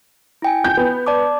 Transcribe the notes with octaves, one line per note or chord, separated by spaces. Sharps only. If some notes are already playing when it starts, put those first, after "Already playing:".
E4 G5 G#5
G6
B3
D5 A5 D6